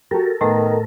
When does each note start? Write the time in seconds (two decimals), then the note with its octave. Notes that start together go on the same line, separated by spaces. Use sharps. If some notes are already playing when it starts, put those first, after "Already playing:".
0.11 F#4 G4 A4 A#4
0.41 A2 D#3 A3 B3